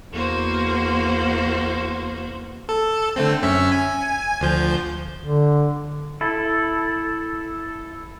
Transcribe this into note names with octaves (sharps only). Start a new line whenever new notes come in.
E2 A#3 F#4 C5
A4
D3 A3 C4
F#2 C#4 E5
G#5
D2 F3 G6
D3
E4 A4